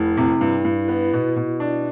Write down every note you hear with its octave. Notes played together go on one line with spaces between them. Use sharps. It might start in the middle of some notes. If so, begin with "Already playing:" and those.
Already playing: F1 E4
C3
G2
G2
B3
B2
B2
D4